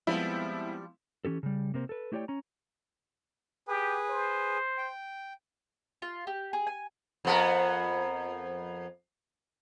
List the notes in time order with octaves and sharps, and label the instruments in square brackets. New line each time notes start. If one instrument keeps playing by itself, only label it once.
[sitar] F3 G3 [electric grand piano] G#3 B3 C4 [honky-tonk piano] E4
[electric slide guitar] E3 C#4 G4 A4
C#3 G3
C3 A#3 C4
A4 B4
A3 E4 G4 C#5 D5 G5
C#4 A#5
[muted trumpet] G4 [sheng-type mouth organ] G#4 B4
[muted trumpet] C5
[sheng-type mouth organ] G5
[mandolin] F4
G4
G#4
G#5
[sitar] F2 B3 A#4